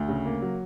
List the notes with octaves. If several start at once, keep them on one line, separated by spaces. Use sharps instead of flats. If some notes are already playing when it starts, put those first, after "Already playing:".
Already playing: D2
C#3
A#3
F#3